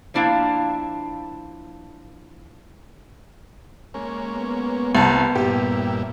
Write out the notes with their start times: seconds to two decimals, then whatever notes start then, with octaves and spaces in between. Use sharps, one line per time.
0.14 F3 A#3 D4 E4 F5
3.94 G#3 A#3 C#4
4.36 B3
4.95 C2 A5
5.35 G2 A#2 E4 G4